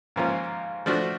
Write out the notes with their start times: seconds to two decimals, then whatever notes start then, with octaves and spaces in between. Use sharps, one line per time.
0.16 G#2 F3 A#3 C#4 F4
0.86 F3 A3 D4 F#4